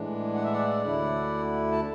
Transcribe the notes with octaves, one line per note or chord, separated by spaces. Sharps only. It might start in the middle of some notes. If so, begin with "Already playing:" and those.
Already playing: A2 E3 G#3 D4
F#5
E5
D5 F#5
D2 D3 A3 E4
A5